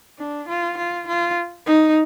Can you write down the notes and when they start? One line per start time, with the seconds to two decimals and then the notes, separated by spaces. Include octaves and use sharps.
0.19 D4
0.48 F4
0.78 F4
1.08 F4
1.66 D#4